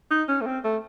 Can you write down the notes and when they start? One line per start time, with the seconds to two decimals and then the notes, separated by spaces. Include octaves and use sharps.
0.11 D#4
0.28 C#4
0.41 A3
0.46 C4
0.64 A3